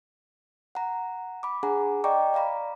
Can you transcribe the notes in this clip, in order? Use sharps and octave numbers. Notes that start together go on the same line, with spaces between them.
F#5 A#5
B5 D6
D4 G#4 F#5 G#5 A#5
D5 D#5 G5 A#5 C#6 D6
D5 F5 A#5 B5